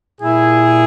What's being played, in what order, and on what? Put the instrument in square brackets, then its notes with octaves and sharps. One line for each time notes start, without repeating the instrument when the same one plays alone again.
[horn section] A#2 G3 E4 G#4